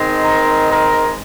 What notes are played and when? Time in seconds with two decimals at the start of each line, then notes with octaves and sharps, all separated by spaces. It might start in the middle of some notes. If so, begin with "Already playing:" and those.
Already playing: D#3 G#3 C4 D#4
0.24 A#4
0.70 A#4